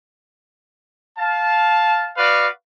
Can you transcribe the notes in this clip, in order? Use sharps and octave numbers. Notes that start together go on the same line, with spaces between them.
F5 A5
F#4 B4 D5 F5